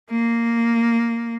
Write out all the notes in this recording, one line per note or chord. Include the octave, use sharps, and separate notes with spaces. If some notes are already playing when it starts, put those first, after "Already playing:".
A#3